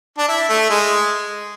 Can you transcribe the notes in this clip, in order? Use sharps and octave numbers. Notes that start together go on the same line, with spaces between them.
D4
E4
A3
G#3